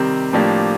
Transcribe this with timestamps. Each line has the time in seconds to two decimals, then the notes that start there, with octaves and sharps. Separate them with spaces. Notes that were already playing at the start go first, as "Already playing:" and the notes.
Already playing: C3 D#3 G3 C4
0.33 A2 F3 A#3 D4 G4